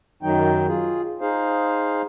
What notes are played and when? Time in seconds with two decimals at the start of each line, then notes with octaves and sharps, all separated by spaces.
0.23 F#2 D#3 F#3 D#4 G5
0.67 F4 G#4
1.21 D#4 G#4 C5 F5